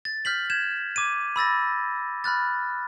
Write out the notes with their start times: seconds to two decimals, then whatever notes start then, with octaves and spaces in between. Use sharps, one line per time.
0.05 A6
0.25 F6 G6 B6 F#7
0.50 G6 G#6 E7
0.96 D6 G#6 D#7
1.36 B5 E6 A6 A#6
2.24 B5 F6 F#6 A6